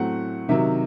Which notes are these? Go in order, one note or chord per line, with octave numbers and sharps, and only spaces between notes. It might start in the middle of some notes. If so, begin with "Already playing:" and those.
Already playing: A2 F#3 A3 C4 F#5
C3 D#3 F#3 E5